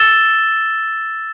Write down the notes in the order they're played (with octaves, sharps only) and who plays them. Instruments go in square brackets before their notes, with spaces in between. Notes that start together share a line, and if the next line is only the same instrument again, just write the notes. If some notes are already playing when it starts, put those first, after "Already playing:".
Already playing: [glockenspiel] E6 A6 E7 G7